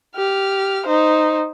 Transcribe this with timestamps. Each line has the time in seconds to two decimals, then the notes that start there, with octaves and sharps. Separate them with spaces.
0.16 G4 F6
0.86 D#4 C5